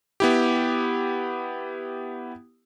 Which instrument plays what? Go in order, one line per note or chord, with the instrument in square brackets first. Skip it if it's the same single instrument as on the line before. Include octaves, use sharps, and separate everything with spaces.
[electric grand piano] B3 E4 G4